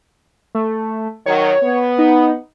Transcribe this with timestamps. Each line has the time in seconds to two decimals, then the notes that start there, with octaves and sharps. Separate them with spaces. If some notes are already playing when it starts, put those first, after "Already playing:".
0.55 A3
1.26 D#3 F#3 C#5
1.62 B3
1.99 D#4